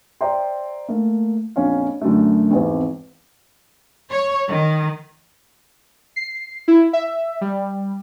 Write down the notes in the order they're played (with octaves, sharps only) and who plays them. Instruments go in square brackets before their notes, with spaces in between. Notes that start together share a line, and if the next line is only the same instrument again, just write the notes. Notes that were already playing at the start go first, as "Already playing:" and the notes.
[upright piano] C5 D5 E5 G5 A#5 C6
A3 A#3
A#1 F2 C#4 C#5 F5
F#2 D3 F#3 A3
G#1 E2 C4
[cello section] C#5
D#3
[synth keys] C7
E4
E5
G3